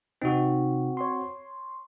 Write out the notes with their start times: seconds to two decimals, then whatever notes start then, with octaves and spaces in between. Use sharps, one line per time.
0.22 C3 C4 D#4 F#4
0.97 C#5 C6